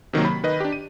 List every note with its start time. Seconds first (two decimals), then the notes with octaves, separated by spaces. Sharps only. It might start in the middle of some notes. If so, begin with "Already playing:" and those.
0.13 C3 D#3 F#3 A#3
0.25 B5
0.43 D#3 B4 D#5
0.60 D4 G4
0.73 D#7